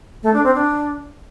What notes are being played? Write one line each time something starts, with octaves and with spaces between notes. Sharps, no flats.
A3
D4
C4
D4